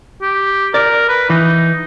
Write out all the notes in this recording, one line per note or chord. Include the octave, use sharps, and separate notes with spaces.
G4
A#4 D5
B4
E3 D#4